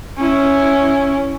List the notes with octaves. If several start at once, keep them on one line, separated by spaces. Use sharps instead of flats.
C#4 E4